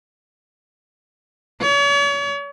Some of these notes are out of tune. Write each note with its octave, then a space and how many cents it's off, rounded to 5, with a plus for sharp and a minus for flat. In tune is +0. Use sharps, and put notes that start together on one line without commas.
C#5 +40